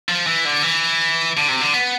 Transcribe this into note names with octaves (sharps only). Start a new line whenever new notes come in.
F3
E3
D3
E3
D3
C3
D3
B3